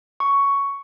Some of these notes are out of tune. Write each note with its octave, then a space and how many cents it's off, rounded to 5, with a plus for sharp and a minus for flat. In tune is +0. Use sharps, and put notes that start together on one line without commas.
C#6 +10